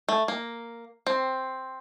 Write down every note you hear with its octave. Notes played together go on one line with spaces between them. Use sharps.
A3
A#3
C4